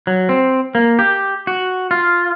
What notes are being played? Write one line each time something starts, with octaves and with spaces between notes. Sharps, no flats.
F#3
C4
A#3
G4
F#4
F4